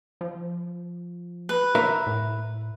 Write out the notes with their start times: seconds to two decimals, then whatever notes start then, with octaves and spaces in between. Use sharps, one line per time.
0.21 F3
1.49 B4
1.75 A#4 E5 A#5
2.07 A2